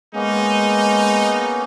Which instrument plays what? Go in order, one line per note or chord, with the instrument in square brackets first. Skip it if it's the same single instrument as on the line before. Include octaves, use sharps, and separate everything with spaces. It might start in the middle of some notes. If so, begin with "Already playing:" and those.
[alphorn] G#3 [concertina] A#3 B3 C#4 [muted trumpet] D#4